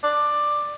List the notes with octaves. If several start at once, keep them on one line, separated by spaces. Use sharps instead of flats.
D5